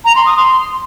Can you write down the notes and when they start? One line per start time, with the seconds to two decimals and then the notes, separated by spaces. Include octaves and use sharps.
0.05 A#5
0.16 C6
0.26 D#6
0.37 C6